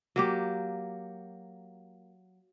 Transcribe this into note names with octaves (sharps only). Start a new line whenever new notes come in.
F#3 A#3 G4